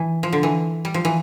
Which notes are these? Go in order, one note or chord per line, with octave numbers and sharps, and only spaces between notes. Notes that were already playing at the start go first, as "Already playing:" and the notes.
Already playing: E3
F3
D3
E3
G3
F3
E3